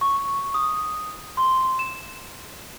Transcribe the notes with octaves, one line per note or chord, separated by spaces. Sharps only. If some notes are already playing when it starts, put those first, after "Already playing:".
C#6
D#6
C6
E7